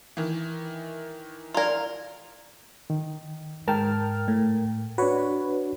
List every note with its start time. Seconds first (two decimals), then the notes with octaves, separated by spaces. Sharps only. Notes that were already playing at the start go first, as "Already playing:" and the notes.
0.17 D#3 E3
1.54 E4 F4 A#4 D5
2.90 D#3
3.68 G#2 A#4 G5 A5 F6
4.28 A2
4.98 D4 F#4 B4 C#5